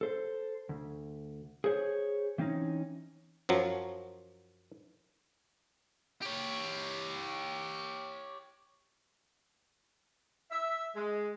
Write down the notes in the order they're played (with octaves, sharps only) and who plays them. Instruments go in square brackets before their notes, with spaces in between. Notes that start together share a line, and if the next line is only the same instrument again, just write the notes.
[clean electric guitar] A4 C5
D2
G#4 C5 C#5
E3 C4 C#4 D#4
[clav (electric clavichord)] F#2 F3 F#3
[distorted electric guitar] G4 C#5
[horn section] E5
G#3